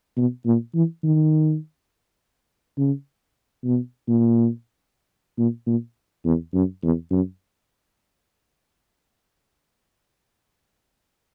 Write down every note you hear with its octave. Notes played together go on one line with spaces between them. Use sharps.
B2
A#2
E3
D#3
C#3
B2
A#2
A#2
A#2
E2
F#2
E2
F#2